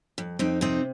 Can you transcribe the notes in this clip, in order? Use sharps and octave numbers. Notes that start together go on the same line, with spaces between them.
F2
F2 C4 D#4
C3 C4 D#4